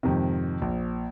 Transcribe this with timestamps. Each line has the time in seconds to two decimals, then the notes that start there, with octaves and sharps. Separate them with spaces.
0.03 F2 G#2 C3 D#3
0.62 A#1